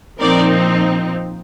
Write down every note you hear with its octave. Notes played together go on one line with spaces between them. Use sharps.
A#2 F3 C4 D#4 A#4 D5